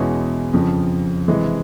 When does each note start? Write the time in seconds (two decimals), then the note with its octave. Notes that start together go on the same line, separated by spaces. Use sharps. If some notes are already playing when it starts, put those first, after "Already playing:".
Already playing: E2 B2 G#3 C#4 E4
0.53 F2 C#3 F3
1.28 C3 E3 G#3